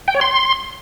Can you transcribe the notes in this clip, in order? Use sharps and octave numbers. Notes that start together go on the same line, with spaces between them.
G5
C#5
C6